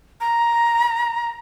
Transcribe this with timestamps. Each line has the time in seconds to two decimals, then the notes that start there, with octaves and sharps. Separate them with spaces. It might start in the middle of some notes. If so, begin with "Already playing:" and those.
0.21 A#5